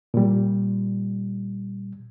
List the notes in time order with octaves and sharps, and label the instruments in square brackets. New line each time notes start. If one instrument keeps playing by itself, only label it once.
[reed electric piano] A#2 G3